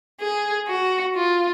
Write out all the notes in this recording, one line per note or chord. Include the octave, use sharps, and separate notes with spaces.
G#4
F#4
F4